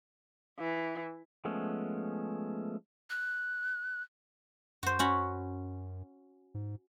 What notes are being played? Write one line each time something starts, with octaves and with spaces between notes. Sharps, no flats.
E3
F3 G#3 A3 B3 C#4
F#6
F#2 F#4 C5
C#4 F#4 B5
G#2